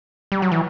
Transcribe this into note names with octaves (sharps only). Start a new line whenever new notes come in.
G3
F#3
E3